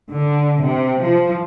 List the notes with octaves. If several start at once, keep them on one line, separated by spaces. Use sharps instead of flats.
D3
C3
F3